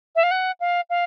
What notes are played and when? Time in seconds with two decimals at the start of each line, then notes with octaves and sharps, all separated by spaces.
0.16 E5
0.23 F5
0.31 F#5
0.60 F5
0.90 F5